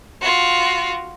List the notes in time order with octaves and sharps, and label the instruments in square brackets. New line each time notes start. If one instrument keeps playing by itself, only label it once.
[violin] F4 F#4